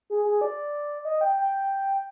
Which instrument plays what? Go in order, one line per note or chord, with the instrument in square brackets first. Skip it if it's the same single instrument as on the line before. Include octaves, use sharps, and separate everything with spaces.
[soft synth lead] G#4
G#4
D5
D#5
G5
G5